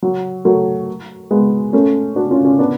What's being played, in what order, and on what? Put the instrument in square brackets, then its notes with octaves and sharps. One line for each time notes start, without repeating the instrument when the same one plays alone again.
[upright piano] F#3
F#3 A3
G#3 B3
A3 C#4
D4 F#4
C#4 F4
C#4 F4
B3 D4